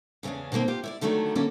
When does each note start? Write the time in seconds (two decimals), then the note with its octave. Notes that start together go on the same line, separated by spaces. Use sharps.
0.23 E2 C#3 B3 C#4 D4
0.52 B2 D#3 F3 A#3 C4
0.68 F4 G4
0.84 E4 C#5 D5
1.01 D3 D#3 F#3 A3 C4 D4
1.35 D3 F#3 A#3 C#4 A4 A#4